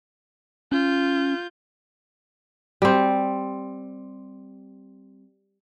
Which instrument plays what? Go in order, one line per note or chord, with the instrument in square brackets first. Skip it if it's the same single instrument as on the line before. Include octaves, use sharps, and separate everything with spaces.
[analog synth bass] C#4 [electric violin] F4 G6
[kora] G3 C4